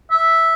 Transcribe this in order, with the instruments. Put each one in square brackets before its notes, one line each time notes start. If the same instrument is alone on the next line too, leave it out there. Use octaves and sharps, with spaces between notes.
[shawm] E5